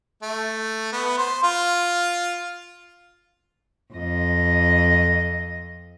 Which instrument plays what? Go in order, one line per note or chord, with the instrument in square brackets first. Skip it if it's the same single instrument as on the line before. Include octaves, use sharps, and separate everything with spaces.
[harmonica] A3
B3
C5
F4
[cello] F2 D#5